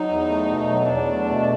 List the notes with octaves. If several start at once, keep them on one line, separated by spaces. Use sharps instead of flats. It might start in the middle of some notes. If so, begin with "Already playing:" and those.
Already playing: F#3 D#4
E2
A3
B2
F#3
E2 D4
A3
B2